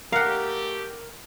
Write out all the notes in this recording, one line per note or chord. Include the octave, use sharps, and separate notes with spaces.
A3 G4 A#4 F5 F#5